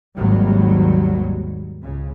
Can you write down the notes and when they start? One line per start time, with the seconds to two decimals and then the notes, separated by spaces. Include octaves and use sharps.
0.16 G#1 D#2 G#2 F#3 G3
1.81 C#2 C#3